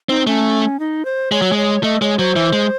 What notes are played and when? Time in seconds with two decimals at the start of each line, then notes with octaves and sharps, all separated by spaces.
0.09 C4 D#4
0.27 A3 C#4
0.80 D#4
1.05 C5
1.32 G#3 C#5
1.42 F#3
1.52 G#3
1.58 C#5
1.83 A3 D#5
2.01 G#3 C#5
2.19 F#3 C5
2.36 E3
2.53 G#3